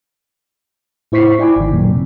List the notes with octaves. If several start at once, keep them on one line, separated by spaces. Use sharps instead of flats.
A2 E4 C5 C#6 B6 C7
E4 D5 G5 G#5 B5 D6
G#1 D#3
F#2 A#2
C3